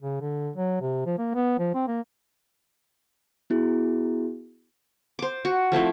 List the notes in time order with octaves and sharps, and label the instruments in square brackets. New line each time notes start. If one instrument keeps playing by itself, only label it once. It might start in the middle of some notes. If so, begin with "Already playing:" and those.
[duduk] C#3
D3
F#3
C3
F3
A#3
B3
F3
C4
A#3
[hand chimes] B3 E4 F#4 G#4
[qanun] C5 D6
F#4
F3 A3 C4 E4